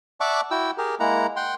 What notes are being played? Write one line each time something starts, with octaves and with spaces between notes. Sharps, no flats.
D5 E5 F#5 A5 C#6 D6
E4 F#4 G5 E6
G4 G#4 A#4
G#3 A#3 E4 F#5 A#5
F#5 G5 C6